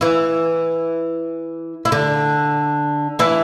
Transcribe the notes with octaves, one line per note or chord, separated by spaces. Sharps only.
E3 E4
E4
D3 D4
E3 E4